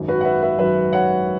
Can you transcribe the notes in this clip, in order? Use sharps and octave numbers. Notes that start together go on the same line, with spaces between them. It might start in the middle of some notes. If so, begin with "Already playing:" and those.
Already playing: G#1 F#2 F#3
F#4 B4
F#5
B4 E5
B4 E5
G#1 F#2 F#3 B4 E5
C#5 F#5